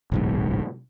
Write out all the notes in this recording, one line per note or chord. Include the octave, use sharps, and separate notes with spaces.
D1 B1 G#2